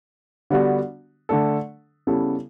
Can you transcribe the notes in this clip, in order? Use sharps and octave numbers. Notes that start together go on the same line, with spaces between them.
D3 G3 B3 D4 F#4
D3 A3 D4 A4
C#3 G3 B3 E4 A4